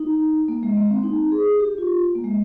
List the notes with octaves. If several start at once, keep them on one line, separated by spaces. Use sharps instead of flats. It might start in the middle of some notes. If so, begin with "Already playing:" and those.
Already playing: D#4
A#3
G#3
A#3
C4
D#4
G#4
G4
F4
A#3
G#3